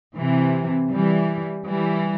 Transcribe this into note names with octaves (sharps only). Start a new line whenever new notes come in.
C3 E3
E3 G3
E3 G3